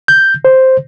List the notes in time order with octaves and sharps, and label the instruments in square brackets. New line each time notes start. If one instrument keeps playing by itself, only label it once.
[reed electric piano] G6
C5